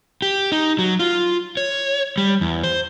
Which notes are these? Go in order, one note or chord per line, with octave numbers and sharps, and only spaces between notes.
G4
D#4
F#3
F4
C#5
G3
E2
C5